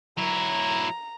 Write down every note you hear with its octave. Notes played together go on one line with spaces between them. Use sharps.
F#3 E4 A#5